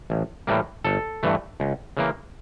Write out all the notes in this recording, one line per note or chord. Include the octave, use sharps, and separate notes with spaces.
A1
A2 E3 G3 A#3
G1 A4
G2 E3 A3
C#2
C#3 E3 A#3